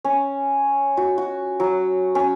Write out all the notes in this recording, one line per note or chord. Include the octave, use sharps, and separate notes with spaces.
C#4
F#4
F#4
F#3
C#4